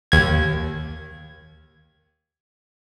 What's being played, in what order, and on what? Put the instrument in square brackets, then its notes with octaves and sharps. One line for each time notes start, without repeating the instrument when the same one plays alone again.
[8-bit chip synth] D#2 G#6